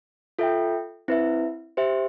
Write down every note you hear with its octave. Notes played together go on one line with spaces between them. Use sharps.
F4 A4 E5 G5
C4 E4 B4 E5
G4 C5 E5